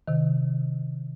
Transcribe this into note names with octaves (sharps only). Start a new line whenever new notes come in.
C3 D#3